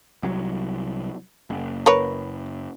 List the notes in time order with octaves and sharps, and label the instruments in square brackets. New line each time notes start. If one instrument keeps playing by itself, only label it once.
[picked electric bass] C2 F#3
F#1
[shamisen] A#4 B4 C#5